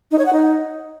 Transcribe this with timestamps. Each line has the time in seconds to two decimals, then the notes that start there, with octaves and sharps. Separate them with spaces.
0.11 D#4
0.19 C#5
0.26 F#5
0.33 D#4